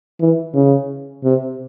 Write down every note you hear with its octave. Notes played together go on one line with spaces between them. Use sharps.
E3
C#3
C3